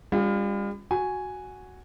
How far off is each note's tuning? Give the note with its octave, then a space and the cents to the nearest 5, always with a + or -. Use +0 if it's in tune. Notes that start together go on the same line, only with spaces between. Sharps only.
G3 +40 C#4 +20 F4 +15
F#4 +0 G#5 +0